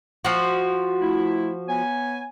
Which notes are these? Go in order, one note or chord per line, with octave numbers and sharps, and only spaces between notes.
F3 F#4
A3 E4
B3 C#5 G#5